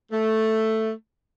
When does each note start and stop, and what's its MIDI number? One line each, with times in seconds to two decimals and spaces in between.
0.12 0.91 57